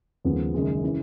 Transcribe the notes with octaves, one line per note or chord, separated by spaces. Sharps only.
D#2 C#3 F3 G#3 B3
F#1 F#2 D#3 G#3
C#3 E3